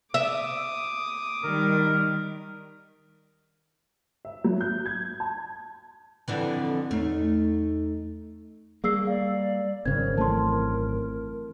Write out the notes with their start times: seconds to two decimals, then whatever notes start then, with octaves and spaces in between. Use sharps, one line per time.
0.14 E5 D6 D#6
1.44 D#3 G3 A#4
4.25 E5
4.44 F#3
4.61 G6
4.86 G#6
5.20 A5
6.28 F2 D3 E3
6.91 E2 A3 C#4 D#4
8.84 G3 A#3 G#4 E6 C7
9.07 D5 F5
9.86 G#1 F#2 C#3 C4 A#4 C5 G#6
10.18 E3 A3 C4 A5 C6